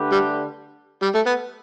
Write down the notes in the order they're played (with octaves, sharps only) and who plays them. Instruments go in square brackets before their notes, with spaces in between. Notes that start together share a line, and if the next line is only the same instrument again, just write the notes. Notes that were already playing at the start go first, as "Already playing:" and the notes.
Already playing: [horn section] D3 A3 D4 G4 B4
[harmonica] G3
G3
A3
B3